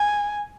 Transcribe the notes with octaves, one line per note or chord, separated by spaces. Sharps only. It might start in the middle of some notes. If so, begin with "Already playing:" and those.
Already playing: G#5